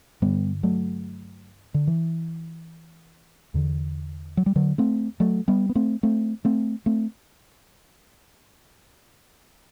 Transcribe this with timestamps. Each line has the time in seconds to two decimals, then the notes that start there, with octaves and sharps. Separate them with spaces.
0.22 G2 D3 G3 B3
0.63 F#3 A3
1.74 D3
1.87 E3
3.54 E2 D3
4.37 F#3
4.46 G3
4.56 D3 F#3
4.78 A3 C4
5.20 F#3 A3
5.48 G3 B3
5.69 B3
5.75 A3 C4
6.03 A3 C4
6.45 A3 C4
6.86 A3 C4